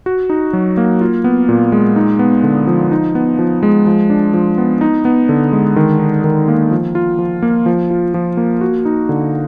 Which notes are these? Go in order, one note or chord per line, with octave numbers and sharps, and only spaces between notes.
F#4
D#4
F#3
A#3
F4
B3
A#2
G#3
D#4
B3
D3
F3
D#4
B3
F3
G#3
F3
D4
F3
B3
D#4
B3
D3
G#3
D#3
D#4
D#3
A#3
F3
F4
F3
A#3
F3
F4
F3
A#3
F#4
D#4
D3